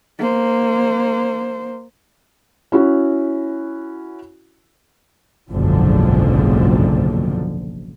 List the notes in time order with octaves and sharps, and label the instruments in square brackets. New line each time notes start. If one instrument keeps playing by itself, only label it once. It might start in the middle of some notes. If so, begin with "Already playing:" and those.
[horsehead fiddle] A#3 C5
[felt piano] C#4 E4 F#4
[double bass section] F#1 B1 G#2 D3 F3